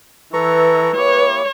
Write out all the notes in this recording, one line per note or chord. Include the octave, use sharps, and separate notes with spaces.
E3 A4 B4 A#5 C#6
A#3 E4 G4 C#5